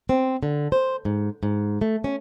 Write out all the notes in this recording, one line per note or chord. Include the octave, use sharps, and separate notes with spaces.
C4
D3
C5
G#2
G#2
A3
C#4